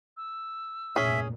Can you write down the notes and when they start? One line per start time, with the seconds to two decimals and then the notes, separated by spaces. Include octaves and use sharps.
0.17 E6
0.96 F1 G2 A#2 C#4 G#4 E5